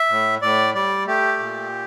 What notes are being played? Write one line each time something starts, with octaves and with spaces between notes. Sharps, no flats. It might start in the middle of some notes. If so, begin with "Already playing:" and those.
Already playing: E5
A2
A2 D5
G3 D5
A3 G4
A#2